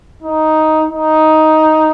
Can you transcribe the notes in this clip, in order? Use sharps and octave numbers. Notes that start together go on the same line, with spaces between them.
D#4
D#4